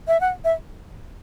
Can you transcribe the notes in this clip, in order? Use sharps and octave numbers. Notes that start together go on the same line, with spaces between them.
E5
F#5
E5